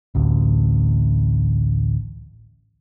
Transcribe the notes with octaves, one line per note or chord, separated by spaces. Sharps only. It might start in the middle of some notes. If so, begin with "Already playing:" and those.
A1 D2